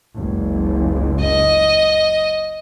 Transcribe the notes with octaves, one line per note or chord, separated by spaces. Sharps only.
F#1 C#2
D#5